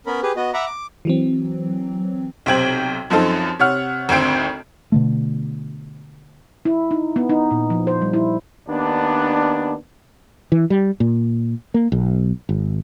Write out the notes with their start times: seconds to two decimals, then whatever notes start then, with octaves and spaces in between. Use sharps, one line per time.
0.06 B3 C#4 A#4 B5
0.23 G4 G#4 B4
0.36 B3 F#4 D#5
0.54 E5 F#5 A#5 B5 D6
0.66 D6
1.05 E3 F#3 C4
2.46 B1 C3 C5 G5 G#6 F#7
3.10 F#2 F3 C4 D#4 A4
3.59 C3 C#5 F#5 F6
4.09 G#1 D2 C4 G5 D7
4.92 B2 D3 A3
6.65 E4
6.91 D#4
7.16 B3
7.29 D#4
7.51 A#2
7.70 F3
7.87 C5
8.02 G3
8.13 E4
8.67 D#2 B3 D4
10.52 E3
10.70 G3
11.00 A#2
11.74 A#3
11.92 B1
12.49 G#1